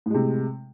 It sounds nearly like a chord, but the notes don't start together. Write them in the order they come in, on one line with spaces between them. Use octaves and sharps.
A2 G#3 C3